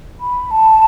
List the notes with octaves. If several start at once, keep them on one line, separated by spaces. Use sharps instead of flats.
B5
A5